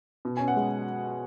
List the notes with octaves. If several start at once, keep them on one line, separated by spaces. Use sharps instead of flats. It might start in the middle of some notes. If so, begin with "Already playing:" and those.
B2
G#5
C#4
F#5
G#3